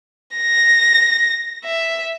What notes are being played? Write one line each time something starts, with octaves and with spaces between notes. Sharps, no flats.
A#6
E5